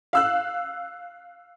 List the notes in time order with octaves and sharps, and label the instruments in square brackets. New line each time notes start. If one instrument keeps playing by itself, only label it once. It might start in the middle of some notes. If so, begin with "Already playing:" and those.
[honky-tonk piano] F5 E6 F#6